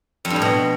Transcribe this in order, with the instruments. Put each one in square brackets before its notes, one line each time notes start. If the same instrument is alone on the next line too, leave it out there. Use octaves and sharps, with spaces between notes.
[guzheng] F2
G2
A2
B2